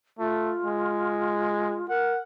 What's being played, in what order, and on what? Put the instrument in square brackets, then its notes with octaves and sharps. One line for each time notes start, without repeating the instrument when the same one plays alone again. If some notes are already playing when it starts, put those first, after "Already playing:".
[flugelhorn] A3 [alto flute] F4
[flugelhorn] G#3
[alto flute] A#4 [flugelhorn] F#5